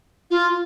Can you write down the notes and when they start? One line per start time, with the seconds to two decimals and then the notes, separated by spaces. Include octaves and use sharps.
0.31 F4